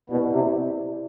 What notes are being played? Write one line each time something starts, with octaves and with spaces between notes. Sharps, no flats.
B2 E4 G4 D5
C3